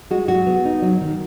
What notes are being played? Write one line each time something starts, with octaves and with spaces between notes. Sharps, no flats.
G#3 F#4
F#3 F#4
B3
D#4
F#3
D#3